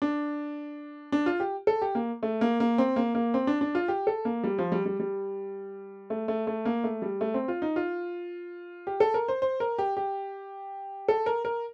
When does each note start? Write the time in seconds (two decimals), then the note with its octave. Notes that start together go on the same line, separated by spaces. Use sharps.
0.02 D4
1.12 D4
1.26 F4
1.40 G4
1.67 A4
1.82 G4
1.95 A#3
2.23 A3
2.41 A#3
2.60 A#3
2.78 C4
2.96 A#3
3.15 A#3
3.34 C4
3.47 D4
3.61 D4
3.75 F4
3.88 G4
4.07 A4
4.25 A#3
4.44 G3
4.58 F3
4.72 G3
4.86 G3
5.00 G3
6.10 A3
6.28 A3
6.47 A3
6.65 A#3
6.84 A3
7.02 G3
7.21 A3
7.34 C4
7.48 F4
7.62 D#4
7.76 F4
8.87 G4
9.00 A4
9.14 A#4
9.28 C5
9.42 C5
9.60 A#4
9.78 G4
9.97 G4
11.08 A4
11.26 A#4
11.45 A#4